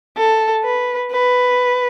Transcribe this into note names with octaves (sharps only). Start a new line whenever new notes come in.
A4
B4
B4